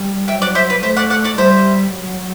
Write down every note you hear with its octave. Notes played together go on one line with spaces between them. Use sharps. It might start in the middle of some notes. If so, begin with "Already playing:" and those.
Already playing: G3
F#3 E5 G5
D5 F#5
C5 E5
B4 D5
A3 C5 E5
D5 F#5
D5 F#5
D5 F#5
G3 C5 E5
F#3